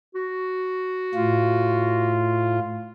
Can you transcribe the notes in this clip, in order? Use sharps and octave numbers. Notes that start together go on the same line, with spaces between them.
F#4
A2 F4